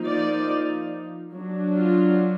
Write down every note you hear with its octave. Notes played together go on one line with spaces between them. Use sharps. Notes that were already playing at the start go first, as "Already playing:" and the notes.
Already playing: F3 A#3 D#4
D5
F#3 D4
F4